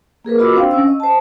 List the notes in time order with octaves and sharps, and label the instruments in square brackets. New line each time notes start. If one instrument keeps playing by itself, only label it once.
[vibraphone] A#3 G#4 A#4 B4
F4 F#4 D#5 B5 D6 E6
C4 D4 C5 F5 G5
C#4 E6
D#5
C5 A5